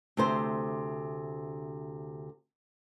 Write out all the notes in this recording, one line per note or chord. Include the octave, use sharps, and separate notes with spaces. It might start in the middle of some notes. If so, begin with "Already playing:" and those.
D2 C3 C5